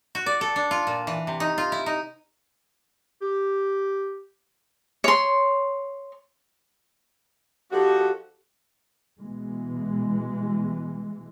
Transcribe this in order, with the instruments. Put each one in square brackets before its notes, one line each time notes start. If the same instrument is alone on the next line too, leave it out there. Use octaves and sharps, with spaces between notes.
[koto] F#4
D5
A4
D4
F4
A#2
E3
C3
D#4
F4
E4
D#4
[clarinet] G4
[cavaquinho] C#5 C6
[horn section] F3 D#4 F#4 [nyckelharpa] G4 A4
[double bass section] B2 E3 G#3